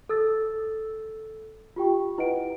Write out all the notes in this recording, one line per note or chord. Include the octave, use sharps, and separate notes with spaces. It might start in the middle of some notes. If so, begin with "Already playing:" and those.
A4 E6 A6
F4 G4 G5 C#6
E4 B4 D#5 F#5 D7